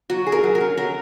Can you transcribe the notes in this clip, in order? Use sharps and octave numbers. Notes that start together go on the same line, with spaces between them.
F#3 F#4
G#4
A#4
F#3
A#4
C#4
F#3 A#4